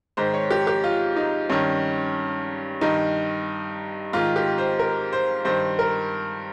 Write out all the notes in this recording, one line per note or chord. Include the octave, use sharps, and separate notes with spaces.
G#2 D#3 C5
C#5
G4
G4
F4
D#4
G2 D#3 C#4
G2 D#3 D#4
G#2 D#3 F4
G4
C5
A#4
C5
G2 D#3 C5
A#4